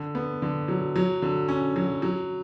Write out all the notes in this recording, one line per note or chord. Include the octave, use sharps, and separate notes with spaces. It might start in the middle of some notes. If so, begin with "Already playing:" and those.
Already playing: D3
B3
D3
F#3
F#3
D3
C#4
F#3
F#3